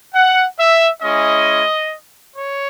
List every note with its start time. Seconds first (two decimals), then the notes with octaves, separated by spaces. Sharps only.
0.14 F#5
0.58 E5
1.02 G#3 C#4 E4 D#5
2.35 C#5